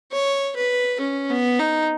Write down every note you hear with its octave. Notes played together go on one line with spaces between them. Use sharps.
C#5
B4
C#4
B3
D#4